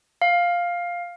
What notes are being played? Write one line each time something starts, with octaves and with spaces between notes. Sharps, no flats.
F5